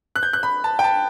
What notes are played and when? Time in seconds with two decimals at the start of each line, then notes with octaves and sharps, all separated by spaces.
0.16 F#6
0.23 G6
0.33 F#6
0.43 B5
0.64 A5
0.79 G5
0.84 A5